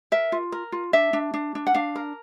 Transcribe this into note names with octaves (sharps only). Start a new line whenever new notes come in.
A#4 E5
F4
A#4
F4
D4 E5
D4
D4
D4
F#5
D4 F5
A#4